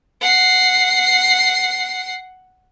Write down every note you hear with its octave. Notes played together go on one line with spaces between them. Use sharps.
F#5 C7